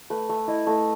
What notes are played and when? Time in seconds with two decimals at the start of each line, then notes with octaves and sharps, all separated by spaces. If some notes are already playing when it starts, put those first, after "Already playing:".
0.10 A3 B4
0.29 A3
0.48 E4 D#5
0.67 A3 D#5